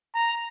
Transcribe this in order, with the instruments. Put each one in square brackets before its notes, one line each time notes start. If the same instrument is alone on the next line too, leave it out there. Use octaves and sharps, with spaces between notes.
[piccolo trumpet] A#5